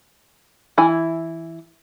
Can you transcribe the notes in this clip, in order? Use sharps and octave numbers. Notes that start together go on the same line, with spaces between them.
E3 E4 G#5